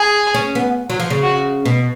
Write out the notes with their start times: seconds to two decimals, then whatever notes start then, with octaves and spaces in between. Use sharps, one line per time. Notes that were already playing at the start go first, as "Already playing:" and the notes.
Already playing: G#4
0.34 C#4
0.55 B3
0.90 F#3
1.00 F3
1.10 C#3
1.22 F#4
1.65 B2